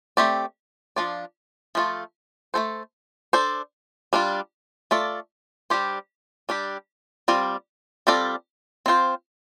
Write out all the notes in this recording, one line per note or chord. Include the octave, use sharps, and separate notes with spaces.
A3 C4 G4 D5
F3 D4 F4 D5
F3 A3 F4 A4
A3 C4 A4 C5
D4 A4 C5
G3 D4 F4
A3 F4 A4 D5
G3 D4 G4 C5
G3 D4 G4
G3 C4 F4 D5
G3 C4 F4 A4 D5
C4 F4 C5